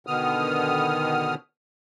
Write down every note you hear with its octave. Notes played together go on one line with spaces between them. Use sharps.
B2 D3 D#3 B3 D#6 F6